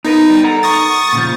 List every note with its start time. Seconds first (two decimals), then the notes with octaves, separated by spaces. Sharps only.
0.05 B3 D#4 A#4 B4
0.30 G3
0.44 A4 F#5 A#5
0.63 C#6 D#6 A6
1.13 A#2 C#3 F3